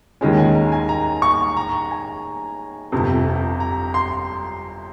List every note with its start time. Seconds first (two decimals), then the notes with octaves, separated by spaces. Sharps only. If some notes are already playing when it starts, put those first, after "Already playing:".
0.21 D#2 D#3 G#3 C#4 G#5
0.38 G#5
0.55 A#5
0.72 G#5
0.89 A#5
1.22 C#6
1.57 A#5
1.91 G#5
2.92 G1 F2 C3
3.60 A#5
3.94 C6